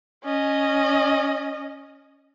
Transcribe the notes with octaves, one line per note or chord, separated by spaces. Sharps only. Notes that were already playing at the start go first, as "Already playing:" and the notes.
C#4 D#5